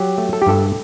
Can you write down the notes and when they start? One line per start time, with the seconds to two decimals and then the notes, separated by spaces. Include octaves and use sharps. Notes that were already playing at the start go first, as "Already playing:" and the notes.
Already playing: F#3 G4
0.18 A3
0.33 A4
0.42 G4
0.46 G2 A4